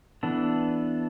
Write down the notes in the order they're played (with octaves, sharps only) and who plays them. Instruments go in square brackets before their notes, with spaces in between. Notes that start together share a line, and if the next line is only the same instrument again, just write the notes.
[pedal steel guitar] E3 B3 D4 A4